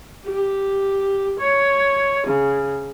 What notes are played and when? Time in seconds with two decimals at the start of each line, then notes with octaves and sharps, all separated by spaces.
0.25 G4
1.39 C#5
2.27 C#3